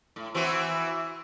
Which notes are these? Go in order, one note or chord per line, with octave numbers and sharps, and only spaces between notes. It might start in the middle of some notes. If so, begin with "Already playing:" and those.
A2
E3 C4 F#4